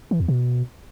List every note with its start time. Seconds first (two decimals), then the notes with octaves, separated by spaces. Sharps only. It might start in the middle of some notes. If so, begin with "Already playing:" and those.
0.11 E3
0.20 E2
0.28 B2